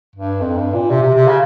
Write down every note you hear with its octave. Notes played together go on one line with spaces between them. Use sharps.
G2
F2
G2
A#2
C3
C3
C3
C#3